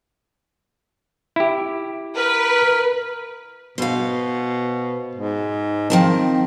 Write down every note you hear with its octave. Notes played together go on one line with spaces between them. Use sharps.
E4 G4
A#4 B4
B2 C5 F5
G#2
D#3 F3 C4 A5